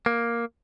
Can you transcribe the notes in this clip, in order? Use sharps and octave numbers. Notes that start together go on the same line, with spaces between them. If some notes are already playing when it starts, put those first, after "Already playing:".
A#3